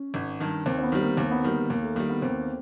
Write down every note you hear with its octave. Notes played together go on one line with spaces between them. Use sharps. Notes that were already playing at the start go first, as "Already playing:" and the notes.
Already playing: C#4
G#1
G2 D#3
D#2 C4
C4
B3
D#3 G3
A#3
D#2 A#3
B3
D#3 G3 A#3
D#2 A#3
A3
D#3 G3 A#3
B3
D#2 C4